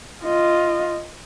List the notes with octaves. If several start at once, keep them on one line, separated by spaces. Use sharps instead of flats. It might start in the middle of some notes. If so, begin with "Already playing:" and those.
F4 D#5